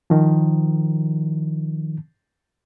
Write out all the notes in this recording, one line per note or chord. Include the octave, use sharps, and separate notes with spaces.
D#3 F3